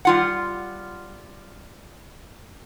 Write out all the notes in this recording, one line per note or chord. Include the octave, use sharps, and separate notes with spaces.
G3 F4 F#5